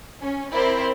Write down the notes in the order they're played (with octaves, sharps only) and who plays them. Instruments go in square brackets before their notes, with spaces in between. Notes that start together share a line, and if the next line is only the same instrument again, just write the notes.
[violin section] C#4
C4 E4 A#4 C5 D5